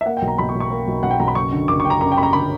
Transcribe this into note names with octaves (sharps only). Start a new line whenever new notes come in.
E5
A#3 F#5
G5
B1
A#5
B1 B5
C#6
B1
C#6
A#3
B1
B1 F#5
G5
B1 A#5
B5
F#1 C#6
D3
F#1 D6
C#6
F#2 G5
A#5
F#2 A#5
G5
F#2 B5
A#5
D3 B5